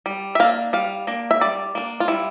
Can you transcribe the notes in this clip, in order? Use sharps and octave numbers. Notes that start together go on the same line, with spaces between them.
G3
E5
A#3 D4 F5
G3 F5
A#3 D4
E5
G3 D5
A#3 D4
F4
G3 E4